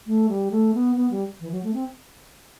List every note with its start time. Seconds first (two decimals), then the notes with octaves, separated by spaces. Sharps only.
0.07 A3
0.29 G3
0.51 A3
0.74 B3
0.96 B3
1.11 G3
1.40 E3
1.52 F#3
1.64 A3
1.74 C4